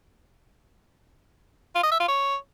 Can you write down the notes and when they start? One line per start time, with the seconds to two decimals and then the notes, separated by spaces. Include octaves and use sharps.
1.75 F4
1.83 D#5
1.91 E5
2.00 F4
2.08 C#5